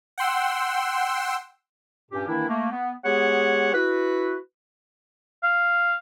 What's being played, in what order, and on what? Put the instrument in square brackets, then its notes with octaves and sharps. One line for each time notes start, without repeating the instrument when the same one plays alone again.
[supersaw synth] F#5 G5 C6 E6
[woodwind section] G2 A#2 C#4 G4
D#3 E3 A#3 D4 E4
A3 A#3
B3
G#3 B3 G4 G#4 C#5 F#5
E4 F#4 B4
[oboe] F5